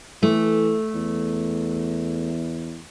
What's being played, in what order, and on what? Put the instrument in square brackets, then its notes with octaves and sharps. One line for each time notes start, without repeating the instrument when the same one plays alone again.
[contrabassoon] E3 [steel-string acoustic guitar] A3
[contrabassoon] E2